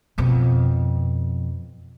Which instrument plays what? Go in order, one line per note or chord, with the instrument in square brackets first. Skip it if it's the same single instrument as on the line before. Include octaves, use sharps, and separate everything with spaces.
[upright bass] F2 B2